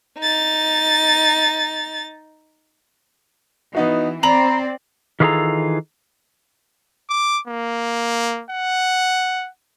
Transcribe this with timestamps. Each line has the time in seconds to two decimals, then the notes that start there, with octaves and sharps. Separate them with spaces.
0.19 D#4 A6
3.75 E3 B3 D#4 F#4
4.23 C4 D5 A#5 B5 F#7
5.20 D#3 E3 F4 G#4 A4 A#5
7.10 D6
7.48 A#3
8.51 F#5